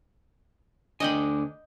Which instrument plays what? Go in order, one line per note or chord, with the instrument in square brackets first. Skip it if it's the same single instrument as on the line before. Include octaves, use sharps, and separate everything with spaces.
[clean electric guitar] D2 D4 G#5 [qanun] D#5 G5 B5